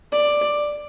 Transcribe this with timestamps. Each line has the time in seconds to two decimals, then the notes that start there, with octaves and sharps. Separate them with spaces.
0.12 D5